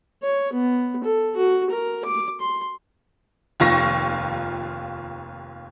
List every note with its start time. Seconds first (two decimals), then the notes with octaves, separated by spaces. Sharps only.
0.23 C#5
0.53 B3
1.04 A4
1.36 F#4
1.70 A#4
2.05 D6
2.40 C6
3.60 F1 D#2 F4 C#6 A#6